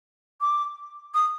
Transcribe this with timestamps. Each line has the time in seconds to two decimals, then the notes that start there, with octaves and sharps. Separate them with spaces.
0.41 D6
1.14 D#6